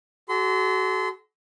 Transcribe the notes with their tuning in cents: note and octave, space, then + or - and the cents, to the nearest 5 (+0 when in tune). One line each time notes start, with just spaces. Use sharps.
F#4 +30 A4 -40 C6 -30